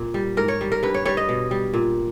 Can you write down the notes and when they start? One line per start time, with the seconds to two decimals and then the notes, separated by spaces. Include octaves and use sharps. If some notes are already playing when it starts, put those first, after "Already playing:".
Already playing: A#2
0.14 G3
0.37 G#2 A#4
0.48 C#5
0.61 G3
0.72 A#4
0.83 G2 B4
0.94 C#5
1.05 G3 C#5
1.17 D#5
1.29 B2
1.51 G3
1.74 A#2